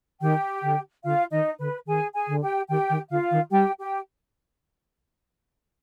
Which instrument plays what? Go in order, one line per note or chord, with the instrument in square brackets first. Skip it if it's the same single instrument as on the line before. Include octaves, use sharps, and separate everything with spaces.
[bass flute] D#3 [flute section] G4 G5
[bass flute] D3
[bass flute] D3 [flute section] F4 F5
[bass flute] D#3 [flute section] D#4 D#5
[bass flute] D3 [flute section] B4
[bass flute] D#3 [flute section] G#4 G#5
[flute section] G#4 G#5
[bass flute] D3
[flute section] G4 G5
[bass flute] D#3 [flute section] G4 G5
[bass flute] D#3
[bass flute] D3 [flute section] F4 F5
[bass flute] D#3
[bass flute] G3 [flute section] G4 G5
[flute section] G4 G5